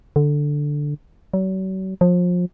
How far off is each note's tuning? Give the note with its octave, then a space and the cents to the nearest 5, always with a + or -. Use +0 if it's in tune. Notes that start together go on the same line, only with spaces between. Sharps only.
D3 +0
F#3 +40
F3 +30